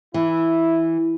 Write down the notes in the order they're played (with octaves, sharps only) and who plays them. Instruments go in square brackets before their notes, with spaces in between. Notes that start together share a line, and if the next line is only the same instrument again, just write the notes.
[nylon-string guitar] E3 [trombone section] E4